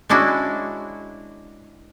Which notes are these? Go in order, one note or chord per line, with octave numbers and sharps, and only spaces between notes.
G#3 C#4 D4 E4 F#4